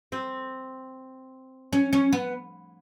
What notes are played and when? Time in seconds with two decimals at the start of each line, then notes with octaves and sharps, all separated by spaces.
0.12 C4
1.73 C#4
1.93 C#4
2.13 B3